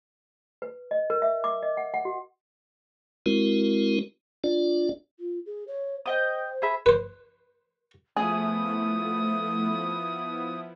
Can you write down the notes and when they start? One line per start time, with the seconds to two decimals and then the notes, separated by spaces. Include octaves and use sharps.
0.62 B4
0.91 D#5
1.10 A#4
1.22 E5
1.44 D6
1.63 D#5
1.77 F#5
1.94 F#5
2.05 F#4
3.26 G#3 C4 E4 F#4 A#4
4.44 D4 F4 D5
5.20 F4
5.46 G#4
5.68 C#5
6.06 C5 D#5 G5 D#6
6.62 G#4 E5 B5
6.86 B4 C5
8.16 F3 A3 B3 E4 G#4 D#6